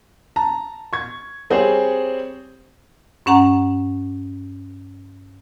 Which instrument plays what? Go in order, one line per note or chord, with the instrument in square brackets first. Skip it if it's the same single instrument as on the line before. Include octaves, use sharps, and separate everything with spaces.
[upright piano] A5 A#5
C#6 G#6
G3 C4 G#4 C5 C#5
[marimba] G2 C#4 F#5 A#5